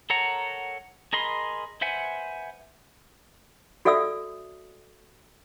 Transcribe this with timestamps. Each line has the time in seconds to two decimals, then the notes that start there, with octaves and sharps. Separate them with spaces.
0.10 A4 A#4 C#5 F#5 A#5
1.13 G#4 A#4 D#5 B5 C6
1.81 B4 C5 E5 F#5 G#5
3.85 F#4 A4 D5 E5 D#6 E6